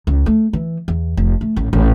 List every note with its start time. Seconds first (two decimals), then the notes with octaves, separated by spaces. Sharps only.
0.07 C#2
0.26 A3
0.53 E3
0.88 E2
1.17 F1
1.41 A3
1.56 A1
1.73 A1